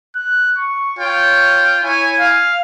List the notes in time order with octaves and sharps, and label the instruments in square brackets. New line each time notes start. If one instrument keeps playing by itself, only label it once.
[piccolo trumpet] F#6
C#6
[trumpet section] F4 G5 [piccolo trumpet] C#5
[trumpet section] E4 G#5 [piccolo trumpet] C#5
[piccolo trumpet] F5